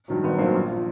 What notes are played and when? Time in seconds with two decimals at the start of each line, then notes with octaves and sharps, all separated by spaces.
0.08 G2 D#3 F#3
0.23 G#1 B3
0.38 G2 D#3 F#3 A#3 C4
0.55 A#1
0.71 F3